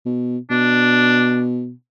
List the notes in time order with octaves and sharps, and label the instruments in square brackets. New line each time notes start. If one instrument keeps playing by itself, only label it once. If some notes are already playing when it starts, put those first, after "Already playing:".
[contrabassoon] B2
[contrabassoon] B2 [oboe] D4